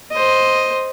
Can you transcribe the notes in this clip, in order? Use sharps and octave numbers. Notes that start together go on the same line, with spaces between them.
C5 D#5